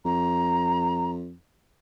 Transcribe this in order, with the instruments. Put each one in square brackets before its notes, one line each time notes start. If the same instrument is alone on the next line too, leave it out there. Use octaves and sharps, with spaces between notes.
[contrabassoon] F2 [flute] A#5